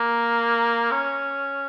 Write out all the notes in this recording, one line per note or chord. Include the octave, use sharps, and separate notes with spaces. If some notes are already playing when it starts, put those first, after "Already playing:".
Already playing: A#3
C#4